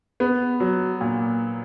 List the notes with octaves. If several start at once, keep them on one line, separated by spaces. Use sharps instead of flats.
B3
F#3
A#2